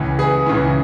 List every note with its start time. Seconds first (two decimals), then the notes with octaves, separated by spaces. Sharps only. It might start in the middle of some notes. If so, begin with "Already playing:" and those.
Already playing: C#2 C#3 E3
0.19 G#4 B4
0.46 C#2 C#3 E3